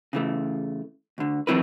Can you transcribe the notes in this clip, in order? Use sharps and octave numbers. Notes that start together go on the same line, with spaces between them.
C#3 E3 A3
D2 D3
E3 F#3 C4 E4 A#4 B4